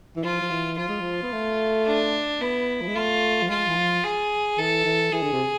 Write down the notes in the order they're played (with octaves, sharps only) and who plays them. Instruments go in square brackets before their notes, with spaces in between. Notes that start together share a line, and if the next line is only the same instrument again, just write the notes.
[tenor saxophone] E3
[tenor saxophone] F3 [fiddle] F4
[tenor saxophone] F3
E3
[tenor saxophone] F3 [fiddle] F4
[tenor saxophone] G#3
F3
B3
A3
[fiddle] D4
[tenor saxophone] B3 [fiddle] E4
[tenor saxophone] F3
G#3
[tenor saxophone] A3 [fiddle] F4
[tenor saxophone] F3
[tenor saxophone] G#3 [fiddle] F4
[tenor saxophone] E3
F3
[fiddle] G#4
[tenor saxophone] E3 [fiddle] A4
[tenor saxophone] E3
[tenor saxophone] E3 [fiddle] G#4
[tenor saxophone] D3
C3